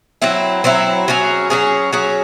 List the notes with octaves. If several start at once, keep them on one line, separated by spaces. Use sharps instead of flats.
F#3 C4 E4
F#3 C4 E4
F#3 C#4 G#4
F#3 C#4 G#4
F#3 C#4 G#4